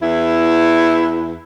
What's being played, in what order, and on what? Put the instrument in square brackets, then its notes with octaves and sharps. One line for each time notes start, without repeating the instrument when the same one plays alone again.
[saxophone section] E2 E4